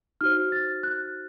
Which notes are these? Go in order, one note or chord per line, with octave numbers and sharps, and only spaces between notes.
D#4 F#4 C5 F6
A6
F#6